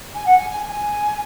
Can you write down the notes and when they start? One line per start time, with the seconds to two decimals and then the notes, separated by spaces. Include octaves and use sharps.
0.15 G#5
0.26 F#5
0.38 G#5
0.50 G#5
0.63 G#5